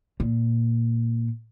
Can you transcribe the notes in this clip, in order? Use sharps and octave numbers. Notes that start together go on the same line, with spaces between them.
A#2